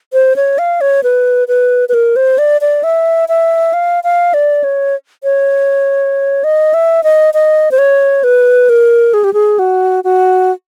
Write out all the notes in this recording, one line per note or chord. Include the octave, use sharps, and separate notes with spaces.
C5
C#5
F5
C#5
B4
B4
B4
A#4
C5
D5
D5
E5
E5
F5
F5
D5
C#5
C#5
D#5
E5
D#5
D#5
C5
C#5
B4
A#4
G#4
G4
G#4
F#4
F#4